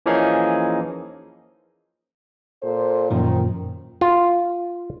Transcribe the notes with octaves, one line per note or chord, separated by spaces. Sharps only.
E3 F3 A#3 C#4 D#4 G#4
A#2 A4 C5
F#2 A#2 D#3 F3
F4